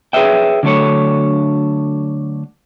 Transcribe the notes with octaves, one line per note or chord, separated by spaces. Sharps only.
G#4 B4 C#5 E5 G5
D3 F#3 A3 D4 A4 C#5